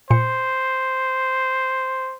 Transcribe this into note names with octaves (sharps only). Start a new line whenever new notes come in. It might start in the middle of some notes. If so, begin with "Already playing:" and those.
A#2 C5 C#7